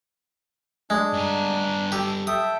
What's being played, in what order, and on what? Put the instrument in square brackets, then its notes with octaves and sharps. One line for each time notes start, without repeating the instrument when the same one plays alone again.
[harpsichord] G#3 [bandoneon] D4
[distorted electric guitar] G2 G#5
[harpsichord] G4 [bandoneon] A4
[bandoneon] A4 E5 G5 [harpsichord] D#6